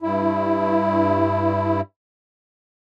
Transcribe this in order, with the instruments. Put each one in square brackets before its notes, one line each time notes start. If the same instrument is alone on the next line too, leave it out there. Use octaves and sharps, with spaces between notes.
[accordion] G2 E4